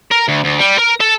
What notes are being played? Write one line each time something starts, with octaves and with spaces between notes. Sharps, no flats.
A#4
D2
D2
G3
A#4
A4 A5